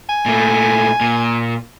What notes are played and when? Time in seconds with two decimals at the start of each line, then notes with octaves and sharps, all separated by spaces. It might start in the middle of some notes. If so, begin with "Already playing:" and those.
0.09 G#5
0.26 A#2 A3
1.01 A#2